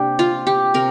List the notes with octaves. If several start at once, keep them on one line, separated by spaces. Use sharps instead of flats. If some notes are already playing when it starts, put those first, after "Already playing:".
Already playing: C3 A#3 D4 G4
F4
G4
C3 A#4